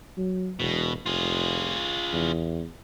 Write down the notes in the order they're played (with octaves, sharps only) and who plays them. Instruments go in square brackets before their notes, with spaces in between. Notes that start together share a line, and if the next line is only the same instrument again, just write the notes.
[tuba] F#3
[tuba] E1 [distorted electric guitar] B2
[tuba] F1 [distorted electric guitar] F4 G#4
[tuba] E2